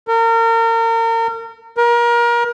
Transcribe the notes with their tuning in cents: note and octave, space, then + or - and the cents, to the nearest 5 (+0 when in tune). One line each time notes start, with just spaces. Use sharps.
A#4 -35
A#4 +30